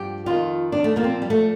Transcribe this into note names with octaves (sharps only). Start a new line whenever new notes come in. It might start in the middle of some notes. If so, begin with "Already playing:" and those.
Already playing: G2 F3 G4
F2 D#3 F4
D4
A3
A#2 F3 A#3
C4
G3
A3